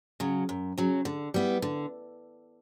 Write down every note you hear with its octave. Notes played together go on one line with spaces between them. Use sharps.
C#3 F#3
F#2
C#3 F#3
D3
G3 B3 E4
D3